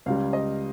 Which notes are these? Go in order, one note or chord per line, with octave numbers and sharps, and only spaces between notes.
C#2 C#3 G3 F5
D#5